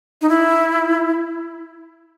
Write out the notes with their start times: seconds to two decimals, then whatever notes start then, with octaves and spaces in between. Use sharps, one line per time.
0.22 D#4
0.29 E4